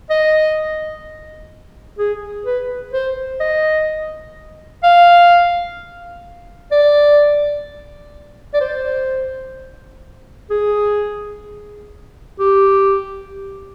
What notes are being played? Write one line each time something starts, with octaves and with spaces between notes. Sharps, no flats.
D#5
G#4
B4
C5
D#5
F5
D5
D5
C5
G#4
G4